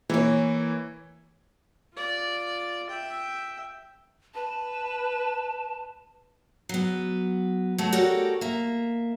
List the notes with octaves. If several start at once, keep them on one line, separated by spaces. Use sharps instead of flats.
E3 A#3 E4 C#5
F4 D5
E5 G5
B4 A5
F#3 B3
F#3 A3
F#4 G4 A4 A#4 C#5 D5
A#3 E5